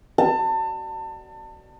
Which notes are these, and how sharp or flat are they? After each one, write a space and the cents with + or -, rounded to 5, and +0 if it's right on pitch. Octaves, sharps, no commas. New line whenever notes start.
A5 +30